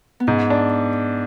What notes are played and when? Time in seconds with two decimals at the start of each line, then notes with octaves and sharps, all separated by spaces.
0.20 B3
0.27 G#2 C#4
0.50 D4